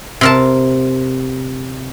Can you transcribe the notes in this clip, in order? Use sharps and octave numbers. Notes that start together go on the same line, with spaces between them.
C3 A#4 A5